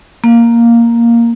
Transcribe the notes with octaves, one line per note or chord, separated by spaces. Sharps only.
A#3